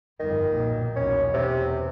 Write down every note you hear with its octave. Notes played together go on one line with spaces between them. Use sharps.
G1 F2 D#3
B1 A#2
B1 E2 C#4
E2 C3